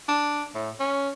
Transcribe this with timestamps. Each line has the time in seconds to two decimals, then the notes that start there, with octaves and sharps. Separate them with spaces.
0.09 D4
0.55 A2
0.80 C#4